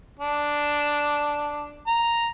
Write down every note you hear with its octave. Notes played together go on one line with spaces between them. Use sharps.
D4
A#5